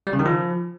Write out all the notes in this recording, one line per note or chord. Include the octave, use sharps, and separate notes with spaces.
G3
C#3
D#3
F3